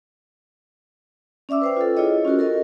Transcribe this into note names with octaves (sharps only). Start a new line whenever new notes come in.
C#4 D5 E5 D6 E6
B4 C5 G5
F4 A4
E4 F4 G#4 C#5 D#5
C#4 F4 F#4 A#4
A4 A#4 D#5